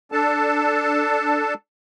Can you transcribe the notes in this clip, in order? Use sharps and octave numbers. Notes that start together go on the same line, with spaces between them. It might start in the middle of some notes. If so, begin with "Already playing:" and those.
D4 A4 A5